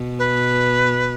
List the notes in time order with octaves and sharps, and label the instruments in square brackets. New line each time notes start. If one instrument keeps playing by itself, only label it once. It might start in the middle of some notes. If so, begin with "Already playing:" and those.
Already playing: [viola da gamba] B2
[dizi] B4